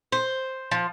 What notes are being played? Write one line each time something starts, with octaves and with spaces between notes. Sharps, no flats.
C5
F3